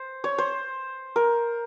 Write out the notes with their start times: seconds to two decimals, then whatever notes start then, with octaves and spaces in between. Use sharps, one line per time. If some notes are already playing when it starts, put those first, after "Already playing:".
Already playing: C5
0.24 C#5
0.38 C5
1.16 A#4